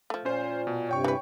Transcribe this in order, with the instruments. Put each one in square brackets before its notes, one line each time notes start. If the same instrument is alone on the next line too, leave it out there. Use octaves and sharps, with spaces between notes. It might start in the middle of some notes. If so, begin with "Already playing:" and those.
[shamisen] F3 A3
[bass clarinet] A#2 [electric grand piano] C#4 F4 C5
[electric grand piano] B2
[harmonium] G2 C3 [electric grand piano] C#5 G5 C#6
[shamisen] E3 B4